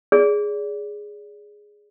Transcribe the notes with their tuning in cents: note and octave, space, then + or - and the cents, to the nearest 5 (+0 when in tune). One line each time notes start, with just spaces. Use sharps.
G#4 +0 D5 -30